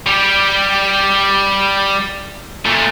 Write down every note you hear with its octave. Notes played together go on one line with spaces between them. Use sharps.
G3 G4
A#2 A3